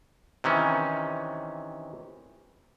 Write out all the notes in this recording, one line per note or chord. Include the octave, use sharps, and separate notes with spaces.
C3 D#3 E3 C#4